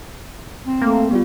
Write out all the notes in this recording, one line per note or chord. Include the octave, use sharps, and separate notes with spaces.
C4
A3 A#3
G3 B3 F4